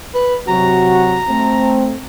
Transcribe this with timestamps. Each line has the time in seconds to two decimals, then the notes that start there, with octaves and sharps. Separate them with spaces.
0.15 B4
0.48 C3 F#3 F#4 A#5
1.29 A3 C4